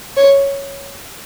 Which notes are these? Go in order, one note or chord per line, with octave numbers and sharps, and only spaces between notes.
C#5